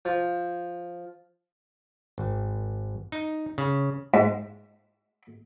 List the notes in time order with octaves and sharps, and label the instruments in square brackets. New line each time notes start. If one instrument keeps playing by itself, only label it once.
[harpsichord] F3
[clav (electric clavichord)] G#1
D#4
C#3
[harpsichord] G#2